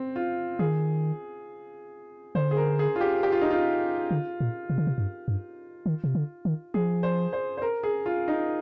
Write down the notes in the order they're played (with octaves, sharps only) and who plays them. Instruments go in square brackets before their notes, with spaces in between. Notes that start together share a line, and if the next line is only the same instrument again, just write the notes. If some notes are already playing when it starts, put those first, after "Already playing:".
Already playing: [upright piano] C4
F4
[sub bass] D#3 [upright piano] G#4
[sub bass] D3 [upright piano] C5
[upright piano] G#4
A#4
G#4
F4
G4
G4
F4
D#4
F4
[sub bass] D3
A#2
C3
D3
C3
G2
G2
D#3
C3
D3
D#3
[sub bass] F3 [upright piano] G#4
[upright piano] C5
C5
C5
A#4
G#4
F4
D#4